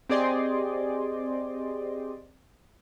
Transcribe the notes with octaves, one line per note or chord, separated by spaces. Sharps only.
C4 G4 G#4 D5 D#5 C6